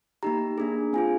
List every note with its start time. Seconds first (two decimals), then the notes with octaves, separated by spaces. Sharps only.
0.23 A#3 D#4 G4 A#5
0.58 A#3 D4 G#4
0.93 C4 F4 G#4 G#5